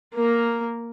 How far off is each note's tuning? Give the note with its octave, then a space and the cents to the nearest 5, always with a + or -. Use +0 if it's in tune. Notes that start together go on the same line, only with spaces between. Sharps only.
A#3 +0 A#4 +0